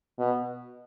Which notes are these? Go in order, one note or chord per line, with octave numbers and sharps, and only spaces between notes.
B2